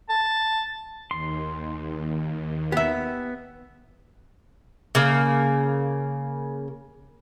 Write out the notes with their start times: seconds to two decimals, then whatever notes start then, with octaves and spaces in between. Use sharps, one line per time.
0.10 A5
1.11 D#2 C6
2.72 B3 G4 E5
4.95 C#3 A#3